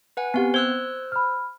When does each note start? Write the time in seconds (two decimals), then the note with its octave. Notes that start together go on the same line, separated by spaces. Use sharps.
0.17 B4 F#5 G#5
0.34 B3 C4 G4 F5 G#5
0.54 C5 E6 F#6 G#6 G7
1.12 B5 F6